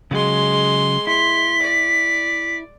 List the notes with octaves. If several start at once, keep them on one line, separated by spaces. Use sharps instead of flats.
C#3 F#3 G#3 C6
E4 C6 B6
D5